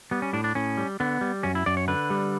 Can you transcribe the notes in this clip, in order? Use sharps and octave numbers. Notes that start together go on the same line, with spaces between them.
G3 B3
C#4
A2 D4
D4
A2 C#4
G3
D3 B3
G3
F#2 C#4
E4
F#2 D5
C#5
D3 B4
G3